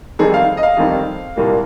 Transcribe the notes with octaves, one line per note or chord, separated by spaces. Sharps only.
F2 D#3 G3 C4 D#4 G#4
F5
D#5
F5
F2 D#3 G3 C4 D#4
C2 A#2 G3 A#3